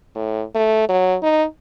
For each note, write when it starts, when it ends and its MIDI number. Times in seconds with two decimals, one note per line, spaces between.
0.15 0.43 45
0.55 0.88 57
0.89 1.16 54
1.23 1.44 63